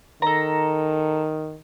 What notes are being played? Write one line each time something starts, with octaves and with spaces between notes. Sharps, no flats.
D#3 A4 A#5